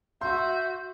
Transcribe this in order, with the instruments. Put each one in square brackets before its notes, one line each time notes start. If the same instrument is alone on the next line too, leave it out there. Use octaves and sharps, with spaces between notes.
[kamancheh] F#4 [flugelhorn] E5 [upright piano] C6 [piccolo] G6